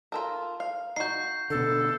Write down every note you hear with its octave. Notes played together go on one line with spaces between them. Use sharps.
F4 A4 A#4
F5
D#4 F#4 G6 C7
B2 D3 A4